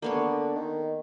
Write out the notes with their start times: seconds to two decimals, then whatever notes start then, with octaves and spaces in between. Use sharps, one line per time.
0.02 D3 A#3 B3 C#5
0.55 D#3